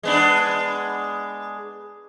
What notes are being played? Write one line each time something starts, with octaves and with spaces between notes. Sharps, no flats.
G#3 B3 D4